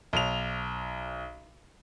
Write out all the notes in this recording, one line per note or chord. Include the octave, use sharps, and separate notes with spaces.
B1 F7